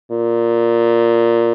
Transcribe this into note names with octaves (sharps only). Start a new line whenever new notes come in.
A#2